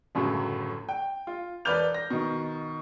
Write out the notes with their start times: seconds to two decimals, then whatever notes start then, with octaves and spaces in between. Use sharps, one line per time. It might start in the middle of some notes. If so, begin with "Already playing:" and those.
0.15 G1 F#2 A2 C#3 F#3
0.89 G5
1.27 F4
1.65 E1 B4 D5 F6 G6 F7
1.94 A#6
2.10 B2 D#3